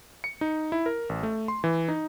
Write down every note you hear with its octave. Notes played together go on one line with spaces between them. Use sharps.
C#7
D#4
E4
A#4
A1
A3
C6
E3
D#4